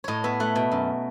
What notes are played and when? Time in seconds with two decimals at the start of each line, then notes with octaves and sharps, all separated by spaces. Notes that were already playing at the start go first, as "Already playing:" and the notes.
0.04 A2 C#5 D#5
0.24 B3 E5
0.40 A3 F#5
0.55 B2
0.72 F#2